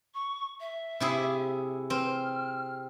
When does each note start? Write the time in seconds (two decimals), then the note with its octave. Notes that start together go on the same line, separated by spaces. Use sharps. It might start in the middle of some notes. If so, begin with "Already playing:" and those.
0.14 C#6
0.60 E5
1.00 C3 E4 G#4
1.90 C4 F6